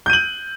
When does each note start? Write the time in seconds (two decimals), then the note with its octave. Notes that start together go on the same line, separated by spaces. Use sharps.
0.06 G6
0.10 D#7
0.13 F#7